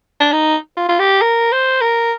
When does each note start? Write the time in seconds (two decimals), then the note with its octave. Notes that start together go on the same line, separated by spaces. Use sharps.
0.21 D4
0.32 D#4
0.77 F4
0.89 F4
1.00 G4
1.22 A#4
1.52 C5
1.81 A#4